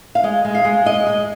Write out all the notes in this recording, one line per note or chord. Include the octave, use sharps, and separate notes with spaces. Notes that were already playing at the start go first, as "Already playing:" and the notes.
F5
G#3 D#5
G#3
F5
G#3
G#3 D#5
G#3